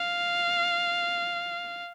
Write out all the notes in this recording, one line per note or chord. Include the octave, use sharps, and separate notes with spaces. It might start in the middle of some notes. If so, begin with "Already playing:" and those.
Already playing: F5